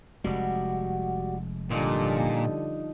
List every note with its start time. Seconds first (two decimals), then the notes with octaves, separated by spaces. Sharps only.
0.24 F1 G3 G#3 F#4
1.70 A#2 D3 F3 G3 D#4